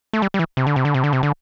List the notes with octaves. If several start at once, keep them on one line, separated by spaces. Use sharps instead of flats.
A3
G3
G3
E3
C3
D3
C3
D3
C3
D3
C3
D3